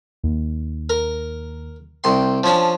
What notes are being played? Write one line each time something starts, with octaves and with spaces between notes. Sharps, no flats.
D#2
A#4
C2 G5 C6 G6
F3 C#4 D4